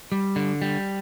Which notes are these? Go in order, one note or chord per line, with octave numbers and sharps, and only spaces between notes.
G3
D3
G3